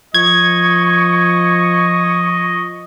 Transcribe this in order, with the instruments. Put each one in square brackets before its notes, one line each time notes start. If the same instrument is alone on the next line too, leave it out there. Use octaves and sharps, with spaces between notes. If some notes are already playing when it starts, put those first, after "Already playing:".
[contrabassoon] F3 [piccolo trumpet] D#5 [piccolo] C#6 [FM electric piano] G#6